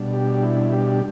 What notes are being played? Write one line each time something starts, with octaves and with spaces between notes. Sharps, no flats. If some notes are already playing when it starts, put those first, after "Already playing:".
Already playing: B2 G3 D4
G4
E4
G4